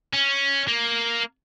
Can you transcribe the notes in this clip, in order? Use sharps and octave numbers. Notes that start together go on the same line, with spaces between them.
C#4
A#3